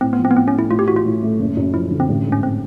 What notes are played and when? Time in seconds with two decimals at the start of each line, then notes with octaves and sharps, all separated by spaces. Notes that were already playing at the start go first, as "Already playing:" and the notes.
0.01 A2 C4
0.13 B3
0.19 F3
0.25 C4
0.31 B3
0.36 A2 C4
0.48 C#4
0.54 A3 E4
0.70 A2 F4
0.79 G4
0.88 E3 F#4
0.96 F4
1.05 A2
1.23 A3
1.40 F#1
1.57 F#2
1.74 F3 E4
1.91 D3
2.00 C4
2.09 A1
2.26 G#2
2.32 C#4
2.43 C4